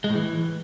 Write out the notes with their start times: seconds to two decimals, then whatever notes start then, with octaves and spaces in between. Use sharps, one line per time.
0.04 G#3
0.10 A2
0.15 E3